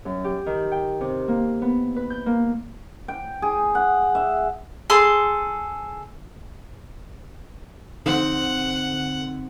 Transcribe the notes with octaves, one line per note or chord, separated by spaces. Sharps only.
F#2
G4
D#3
G5
C3
A#3
B3
B4
G6
A#3
G5
G#4
F#5
E5
G#4 A4 C6
D3 C4 D#4 F#5